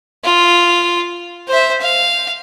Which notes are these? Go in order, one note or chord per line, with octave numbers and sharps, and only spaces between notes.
F4
C5 E5
F5